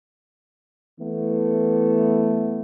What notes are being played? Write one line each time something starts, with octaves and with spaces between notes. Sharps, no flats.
E3 A3 B3